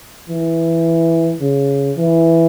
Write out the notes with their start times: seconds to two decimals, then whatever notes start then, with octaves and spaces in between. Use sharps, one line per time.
0.29 E3
1.41 C#3
1.97 E3